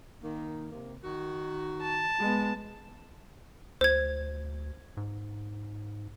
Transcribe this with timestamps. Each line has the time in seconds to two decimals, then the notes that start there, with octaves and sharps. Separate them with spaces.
0.24 D#3 A#3
0.71 C3 A#3
1.04 D#3 F#4
1.82 A5
2.19 G#3 B3
3.81 D2 C5 G#6
4.97 G#2